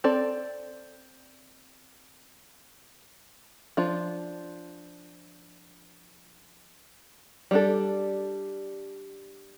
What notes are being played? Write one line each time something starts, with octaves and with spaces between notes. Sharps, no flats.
C4 A4 D5
F3 D4 F4
G3 D4 A4